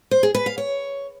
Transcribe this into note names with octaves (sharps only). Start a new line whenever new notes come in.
C5
G#4
B4
F5
C#5